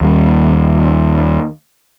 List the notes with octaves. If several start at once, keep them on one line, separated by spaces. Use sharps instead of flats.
D#2 G3